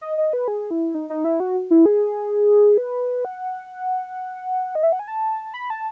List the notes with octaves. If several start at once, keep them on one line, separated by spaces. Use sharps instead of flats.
D#5
D#5
B4
G#4
E4
D#4
D#4
E4
F#4
E4
G#4
B4
F#5
D#5
E5
F#5
G#5
A5
B5
A5